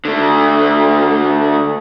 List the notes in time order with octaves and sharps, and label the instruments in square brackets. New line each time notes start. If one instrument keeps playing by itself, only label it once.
[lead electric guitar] D3 A3